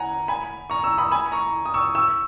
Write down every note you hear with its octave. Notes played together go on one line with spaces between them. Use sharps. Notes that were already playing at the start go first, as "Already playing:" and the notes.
Already playing: F#5 G#5 A#5
G#5 B5
A#5 C#6
C#6 E6
B5 D#6
G#5 B5
A#5 C#6
D#6
C#6 E6
C#6 E6